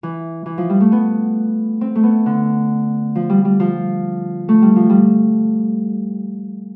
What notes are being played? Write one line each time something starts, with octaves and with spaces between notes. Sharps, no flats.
E3
E3
F3
G3
A3
B3
C4
A3
B3
D3
F3
G3
G3
F3
A3
G3
F3
G3